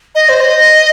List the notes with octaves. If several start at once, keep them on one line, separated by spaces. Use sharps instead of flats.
D#5
C5
D#5